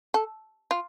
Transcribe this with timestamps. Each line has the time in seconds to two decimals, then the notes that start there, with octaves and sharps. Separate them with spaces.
0.14 A4
0.71 F4